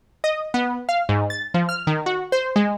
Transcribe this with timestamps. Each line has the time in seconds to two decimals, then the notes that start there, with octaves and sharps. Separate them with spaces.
0.24 D#5
0.54 B3
0.89 F5
1.09 G#2
1.30 A6
1.54 F3
1.69 F6
1.87 D#3
2.06 F#4
2.32 C5
2.56 G#3